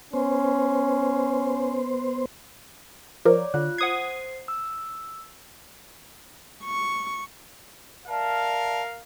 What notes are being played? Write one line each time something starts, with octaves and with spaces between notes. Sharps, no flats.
B3 C#4 C5
F3 A#4 C#5 D5 D6
D3 F4 F#6
C5 F#5 D#6 G#6 C7
E6
C#6
A#4 D5 E5 F5 A5